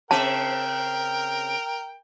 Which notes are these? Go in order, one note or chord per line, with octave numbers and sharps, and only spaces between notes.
C#3 C4 A#4 E5 G5 A5